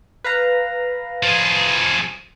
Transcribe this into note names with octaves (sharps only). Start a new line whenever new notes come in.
B4 F5 A#5
F3 G#4